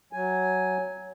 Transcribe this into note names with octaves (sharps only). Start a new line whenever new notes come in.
F#3 G#5